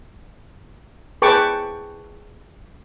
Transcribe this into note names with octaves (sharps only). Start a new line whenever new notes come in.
G#4 B4 G5 A5 C#6 D6